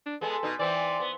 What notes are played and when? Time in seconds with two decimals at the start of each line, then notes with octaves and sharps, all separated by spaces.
0.06 D4
0.21 G#3 B3 A4
0.43 B2 D#4
0.59 E3 C4 D5
1.00 B3